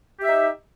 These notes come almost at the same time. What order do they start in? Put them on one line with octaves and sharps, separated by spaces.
G4 E5 D#4